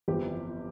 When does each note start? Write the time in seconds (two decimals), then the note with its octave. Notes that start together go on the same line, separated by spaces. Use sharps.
0.08 G1 F2 E3 G3 C4 G4